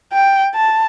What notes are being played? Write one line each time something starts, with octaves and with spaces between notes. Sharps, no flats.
G5
A5